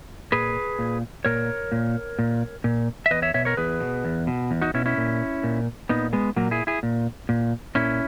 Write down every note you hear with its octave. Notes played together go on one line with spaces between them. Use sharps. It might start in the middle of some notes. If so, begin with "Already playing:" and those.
A#2 G#4 B4
A#2
A#2 A#4 C#5
A#2
A#2
A#2
E5
E2 B4 D#5
C#5 E5
B2 C#5 E5
A#4 C#5
E2 G#4 B4
B2
E2
B2
E2
D#4 F#4
B2 C#4 E4
C#4 E4
A#2
A#2
A#2 B3 D#4
G#3 B3
A#2 F#3 A#3
E4 G#4
E4 G#4
A#2
A#2
A#2 C#4 E4